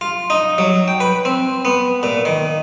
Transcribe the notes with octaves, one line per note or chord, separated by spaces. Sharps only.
F4
D#4
F#3
G5
B4
C4
B3
A#2
D#3